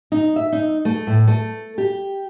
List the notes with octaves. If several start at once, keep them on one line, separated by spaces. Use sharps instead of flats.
D#4
E5
D#4
A3
A2
A3
G4